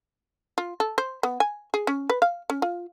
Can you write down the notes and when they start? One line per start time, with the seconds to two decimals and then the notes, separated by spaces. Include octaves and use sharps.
0.58 F4
0.80 A4
0.98 C5
1.23 B3
1.40 G#5
1.74 G#4
1.87 C#4
2.10 B4
2.22 F5
2.50 C#4
2.62 F4